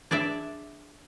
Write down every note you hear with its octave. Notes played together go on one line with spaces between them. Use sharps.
D4 G#4 D5 E5